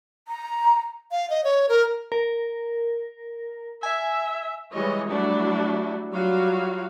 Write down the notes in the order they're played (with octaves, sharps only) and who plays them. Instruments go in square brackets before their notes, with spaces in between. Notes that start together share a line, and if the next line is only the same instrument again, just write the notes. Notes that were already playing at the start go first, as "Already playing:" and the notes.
[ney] A#5
[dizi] F5
D#5
C#5
A#4
[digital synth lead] A#4
[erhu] E5 [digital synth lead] G#5
[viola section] E3 G3 G#3 C#5 D#5
F#3 G3 A3 D4 E4 F#4
F#3 G3 F4 F#4 F5